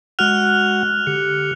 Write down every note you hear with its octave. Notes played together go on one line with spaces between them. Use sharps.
G#3 F#4 F#5 F6 F#6 F7
D3 G4 C#7